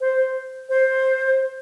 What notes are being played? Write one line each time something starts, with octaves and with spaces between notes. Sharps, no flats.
C5
C5